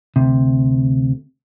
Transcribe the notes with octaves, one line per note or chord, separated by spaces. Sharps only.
D2 C3